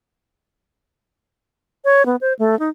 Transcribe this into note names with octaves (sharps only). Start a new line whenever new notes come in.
C#5
B3
C5
A3
D#4